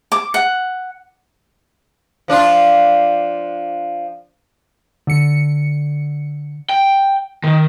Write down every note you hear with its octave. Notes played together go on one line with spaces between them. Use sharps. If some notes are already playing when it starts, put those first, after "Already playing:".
D6
F#5
F3 D4 F4
D3 C#7
G5
D#3